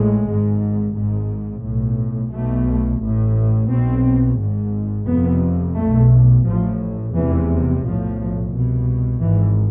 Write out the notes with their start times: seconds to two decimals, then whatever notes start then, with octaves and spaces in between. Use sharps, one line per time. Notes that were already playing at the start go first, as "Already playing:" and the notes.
Already playing: A1 A2 G#3
0.26 G#1 G#2
0.94 G#1 G#2
1.63 B1 A2
2.33 B1 B2 A3
3.01 A1 A2
3.70 B1 B2 C4
4.39 G#1 G#2
5.08 F1 F2 C3 B3
5.77 B1 B2 A3
6.46 A1 A2 F3
7.14 F1 E2 C3 E3
7.83 B1 A2 F3
8.53 C2 B2
9.21 G#1 G#2 E3